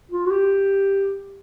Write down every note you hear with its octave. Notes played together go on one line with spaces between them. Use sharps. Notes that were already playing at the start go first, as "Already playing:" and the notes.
F4
F#4
G4